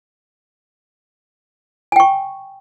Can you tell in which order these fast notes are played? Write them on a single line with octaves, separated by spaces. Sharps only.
G#5 G5 C#6